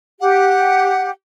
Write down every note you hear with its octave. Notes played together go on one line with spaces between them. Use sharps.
G4 F#5